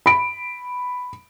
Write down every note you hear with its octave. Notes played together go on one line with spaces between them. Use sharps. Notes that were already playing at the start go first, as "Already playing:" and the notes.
B5 D7